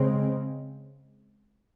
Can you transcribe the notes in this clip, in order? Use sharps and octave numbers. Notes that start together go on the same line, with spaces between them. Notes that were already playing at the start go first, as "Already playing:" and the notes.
Already playing: C#3 G#3 C4